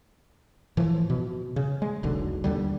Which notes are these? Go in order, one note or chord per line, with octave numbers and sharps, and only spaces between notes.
A2 E3 F3
B2
C#3
G#3
E1 B1 D3
D#2 D3 G3